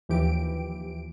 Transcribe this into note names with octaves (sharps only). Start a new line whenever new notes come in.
D#2 E3 F3 G4 D7